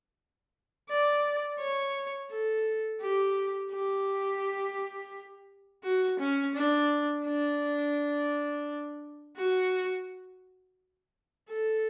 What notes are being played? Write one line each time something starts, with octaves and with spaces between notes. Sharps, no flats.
D5
C#5
A4
G4
G4
F#4
C#4
D4
D4
F#4
A4